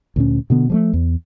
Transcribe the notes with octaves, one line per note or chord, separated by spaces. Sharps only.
D2 A#2 C#4
B2 D3 B3
F3 G3 A3
E2